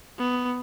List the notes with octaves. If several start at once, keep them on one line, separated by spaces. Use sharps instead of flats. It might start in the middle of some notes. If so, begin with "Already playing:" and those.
B3